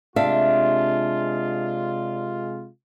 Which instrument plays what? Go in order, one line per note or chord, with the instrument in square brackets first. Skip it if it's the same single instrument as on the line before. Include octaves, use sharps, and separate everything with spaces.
[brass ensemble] C3 G#3 F4 [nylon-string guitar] D4 E5 F5